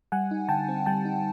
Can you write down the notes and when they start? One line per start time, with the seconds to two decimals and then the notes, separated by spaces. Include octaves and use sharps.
0.12 G3 F#5 G#5
0.31 D#4
0.49 D3 G5 A5
0.68 C4
0.86 G3 G5 A5
1.05 D#4